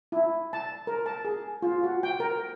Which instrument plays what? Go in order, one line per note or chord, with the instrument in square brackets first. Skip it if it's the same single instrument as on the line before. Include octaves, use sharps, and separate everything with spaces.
[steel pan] E4
A5
A#4
A5
G#4
F4
F#4
G5
A#4